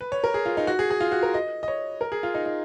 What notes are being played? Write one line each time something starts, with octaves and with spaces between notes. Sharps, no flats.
B4
C#5
A#4
G#4
F4
D#4
F#4
G#4
G#4
F4
F#4
A#4
D#5
D#5
C#5
A#4
G#4
F4
D#4
D#4